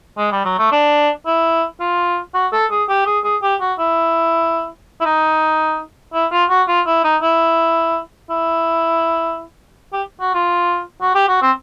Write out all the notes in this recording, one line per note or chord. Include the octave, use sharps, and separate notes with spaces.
G#3
G3
F#3
A3
D4
E4
F4
F#4
A4
G#4
G4
G#4
G#4
G4
F#4
E4
E4
D#4
E4
F4
F#4
F4
E4
D#4
E4
E4
G4
F#4
F4
F#4
G4
F#4
C4